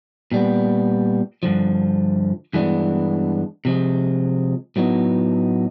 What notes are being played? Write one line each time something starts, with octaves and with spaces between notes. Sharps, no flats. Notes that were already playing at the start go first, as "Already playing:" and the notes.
A#2 G3 B3
G2 D3 F3
G2 E3 G#3 B3 D4
C3 F3 G#3
A2 F#3 B3 D#4